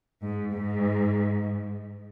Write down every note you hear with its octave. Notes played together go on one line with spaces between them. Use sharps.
G#2
G#2